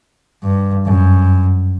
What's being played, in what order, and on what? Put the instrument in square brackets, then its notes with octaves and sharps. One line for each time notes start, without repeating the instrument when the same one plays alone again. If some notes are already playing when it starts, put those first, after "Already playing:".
[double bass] G2
F#2